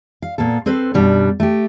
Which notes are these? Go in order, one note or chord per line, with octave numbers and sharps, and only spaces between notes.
F5
A#2 A#3 B3 A4
C4 A4 B4 C5
F#2 B2 G3 D4
A3 G4